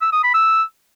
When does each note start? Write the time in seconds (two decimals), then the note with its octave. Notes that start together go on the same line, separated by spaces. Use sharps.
0.01 E6
0.12 D#6
0.23 B5
0.34 E6